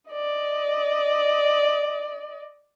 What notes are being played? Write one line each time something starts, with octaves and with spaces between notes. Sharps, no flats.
D5 D#5